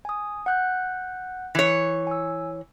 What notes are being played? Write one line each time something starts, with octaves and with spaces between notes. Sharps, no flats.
G#5 D#6
F#5 F#6 G6
E3 C#5
G#5 E6